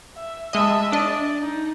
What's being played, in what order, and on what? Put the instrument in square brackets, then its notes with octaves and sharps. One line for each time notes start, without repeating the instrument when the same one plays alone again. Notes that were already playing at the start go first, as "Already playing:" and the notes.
[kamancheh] E5
[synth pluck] G#3 D#5 [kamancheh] E5 A5
[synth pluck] D4 D#5 [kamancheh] D5
[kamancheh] D#4